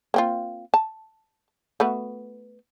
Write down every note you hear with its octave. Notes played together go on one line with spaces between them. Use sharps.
A#3 C4 F4
A5
A3 B3 F#4